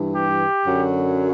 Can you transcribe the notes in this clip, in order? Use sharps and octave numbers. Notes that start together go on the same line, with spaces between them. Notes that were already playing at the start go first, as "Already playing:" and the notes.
Already playing: G2 E3
G4
F#2 D3 F#3